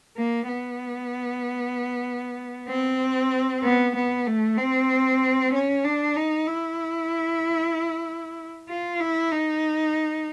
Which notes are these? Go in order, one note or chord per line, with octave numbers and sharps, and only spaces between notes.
A#3
B3
C4
B3
B3
A3
C4
C#4
D4
D#4
E4
F4
E4
D#4